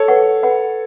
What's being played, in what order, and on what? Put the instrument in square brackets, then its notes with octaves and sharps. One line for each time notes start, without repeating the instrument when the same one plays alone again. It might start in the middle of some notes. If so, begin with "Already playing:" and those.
Already playing: [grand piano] A4 C#5
[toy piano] B4 F#5 C#6
B4 F#5 B5